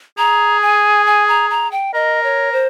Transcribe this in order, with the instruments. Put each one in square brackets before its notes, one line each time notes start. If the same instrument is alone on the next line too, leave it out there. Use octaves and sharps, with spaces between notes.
[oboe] G#4 [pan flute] A#5
[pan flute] G#5
G#5
A#5
A#5
G5
[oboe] A#4 [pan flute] D#5
[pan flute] C#5
C5